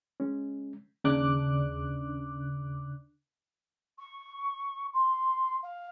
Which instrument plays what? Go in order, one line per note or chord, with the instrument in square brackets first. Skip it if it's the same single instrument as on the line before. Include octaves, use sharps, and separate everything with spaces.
[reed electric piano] G#3 C#4
[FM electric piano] D#2 C#3 D4 D6 F#6
[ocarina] C#6
C6
F5